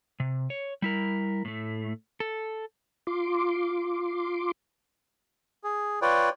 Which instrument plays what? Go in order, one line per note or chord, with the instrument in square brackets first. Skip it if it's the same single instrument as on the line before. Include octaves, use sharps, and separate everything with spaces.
[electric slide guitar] C3
C#5
G3 E4 A#4
A2 A3
A4
[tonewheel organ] F4 C6 D6
[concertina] G#4
F4 B4 C#5 D5 G5